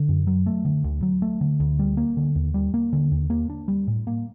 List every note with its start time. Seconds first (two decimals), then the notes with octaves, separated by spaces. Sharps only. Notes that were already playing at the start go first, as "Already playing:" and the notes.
Already playing: D3
0.09 F#2
0.27 F#3
0.46 A3
0.65 D3
0.84 D2
1.03 F#3
1.22 A3
1.41 D3
1.60 D2
1.79 G3
1.97 A#3
2.17 D3
2.35 D#2
2.54 G3
2.74 A#3
2.93 D3
3.11 D#2
3.30 A#3
3.50 D4
3.68 G3
3.88 A2
4.07 A#3